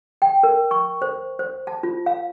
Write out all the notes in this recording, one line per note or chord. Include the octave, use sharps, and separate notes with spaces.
G5
A#4
C#6
C5
C5
A5
F4
F5